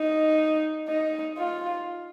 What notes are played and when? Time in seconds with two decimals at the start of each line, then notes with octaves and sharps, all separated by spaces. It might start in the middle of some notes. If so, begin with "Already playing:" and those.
Already playing: D#4
0.88 D#4
1.38 F4